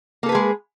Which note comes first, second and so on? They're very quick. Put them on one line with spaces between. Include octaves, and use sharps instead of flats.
A#3 A4 B4 G#4 G#3